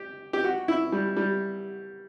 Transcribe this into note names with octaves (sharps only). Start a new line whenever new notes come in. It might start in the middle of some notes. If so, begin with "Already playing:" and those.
Already playing: G4
G4
F#4
E4
G3
G3